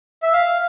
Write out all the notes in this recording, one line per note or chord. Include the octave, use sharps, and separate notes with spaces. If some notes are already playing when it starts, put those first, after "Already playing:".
E5
F5